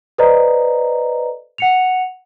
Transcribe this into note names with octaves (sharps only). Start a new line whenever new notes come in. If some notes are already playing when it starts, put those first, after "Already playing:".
A4 B4 C5 D5 D#5 A#5
F#5 C#7 F7